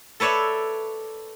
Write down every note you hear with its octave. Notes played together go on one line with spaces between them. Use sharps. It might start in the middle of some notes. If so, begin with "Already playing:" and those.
A4 B4 C#5 D5 E5